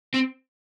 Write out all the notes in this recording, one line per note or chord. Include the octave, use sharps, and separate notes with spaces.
C4